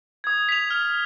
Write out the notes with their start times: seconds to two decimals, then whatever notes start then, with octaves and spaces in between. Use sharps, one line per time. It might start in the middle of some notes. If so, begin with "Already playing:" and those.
0.24 D#6 G#6
0.49 B6 F7
0.70 F6